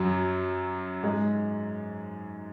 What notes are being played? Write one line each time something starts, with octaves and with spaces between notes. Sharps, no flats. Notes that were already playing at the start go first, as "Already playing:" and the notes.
Already playing: F#2 F#3
G#2 G#3